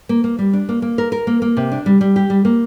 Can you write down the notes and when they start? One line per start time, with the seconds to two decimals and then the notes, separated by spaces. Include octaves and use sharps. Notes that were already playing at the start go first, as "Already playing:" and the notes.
0.09 A#3
0.24 A#3
0.39 G3
0.53 D4
0.69 A#3
0.82 A#3
0.98 A#4
1.12 A#4
1.27 A#3
1.42 A#3
1.57 C3
1.72 D4
1.86 G3
2.01 G3
2.16 G4
2.30 G3
2.45 A#3